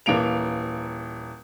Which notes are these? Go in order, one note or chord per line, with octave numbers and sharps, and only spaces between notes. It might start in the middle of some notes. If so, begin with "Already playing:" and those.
D#1 E3 A#3 D7 F7